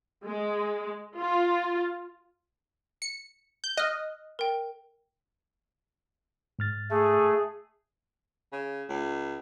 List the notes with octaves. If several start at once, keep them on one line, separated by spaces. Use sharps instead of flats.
G#3
F4
C#7
G6
D#5 F6 F#6
A#4 G5
G#2 F6 A6
A3 G#4
C#3
C#2